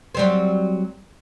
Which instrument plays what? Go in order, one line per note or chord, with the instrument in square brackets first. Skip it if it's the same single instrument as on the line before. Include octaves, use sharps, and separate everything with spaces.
[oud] F#3 G3 C4